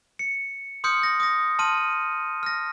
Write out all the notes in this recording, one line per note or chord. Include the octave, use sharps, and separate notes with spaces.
C#7
C6 D#6 F6 G6 C#7
A#6
D#6 A#6
A5 C6 F6 D#7
F6 A#6